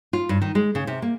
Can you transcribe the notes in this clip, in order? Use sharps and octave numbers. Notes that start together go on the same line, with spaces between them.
F4
G2
D#3
G#3
C#3
C3
A#3